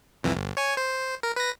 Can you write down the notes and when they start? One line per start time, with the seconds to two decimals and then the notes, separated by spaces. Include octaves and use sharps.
0.23 C2 F2 E3
0.37 G1
0.57 C#5 G#5
0.77 C5
1.23 A#4
1.36 B4 A#6